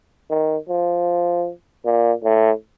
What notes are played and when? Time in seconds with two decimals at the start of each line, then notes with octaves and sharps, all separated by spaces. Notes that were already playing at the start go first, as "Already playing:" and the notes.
0.30 D#3
0.69 F3
1.85 A#2
2.24 A2